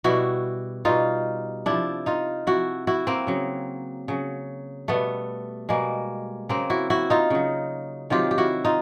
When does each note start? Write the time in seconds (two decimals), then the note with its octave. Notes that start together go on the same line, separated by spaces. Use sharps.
0.04 B2 G3 E4 F#4
0.85 B2 G3 D#4 F4
1.66 C3 F3 D4 E4
2.06 D#4 F4
2.47 C3 F3 E4 F#4
2.87 E4 F#4
3.07 A#3 C4
3.27 C#3 F#3
4.08 C#3 F#3
4.88 B2 G3 A3 B3
5.69 B2 G3 G#3 A#3
6.49 C#3 F#3 A#3 C4
6.70 E4 F#4
6.90 E4 F#4
7.10 D#4 F4
7.30 C#3 F#3
8.10 C3 D#3 F#3 F4 G4
8.31 G4
8.38 E4 F#4
8.65 D#4 F4